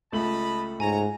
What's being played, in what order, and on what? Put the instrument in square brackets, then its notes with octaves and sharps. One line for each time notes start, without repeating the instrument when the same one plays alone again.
[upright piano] C#2 A3 F#7 [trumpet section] D#5 A5 B5
[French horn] G#2 [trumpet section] C#5 A#5 [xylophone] G#5